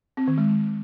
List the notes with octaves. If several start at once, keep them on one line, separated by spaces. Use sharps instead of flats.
C4
D#3
G#3